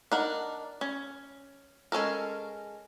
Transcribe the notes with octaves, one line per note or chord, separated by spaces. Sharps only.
D4 D#4 A#4 F#5
C#4
G#3 C#4 A4 A#4